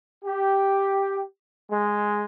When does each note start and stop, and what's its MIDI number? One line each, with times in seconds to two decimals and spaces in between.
0.25 1.22 67
1.70 2.24 56